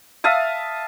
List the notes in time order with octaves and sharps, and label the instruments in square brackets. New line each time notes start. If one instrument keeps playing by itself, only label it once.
[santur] E5 F5 A5 D#6